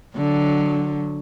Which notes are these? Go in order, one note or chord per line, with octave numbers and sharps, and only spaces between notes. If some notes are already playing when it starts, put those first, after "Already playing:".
D3 F#3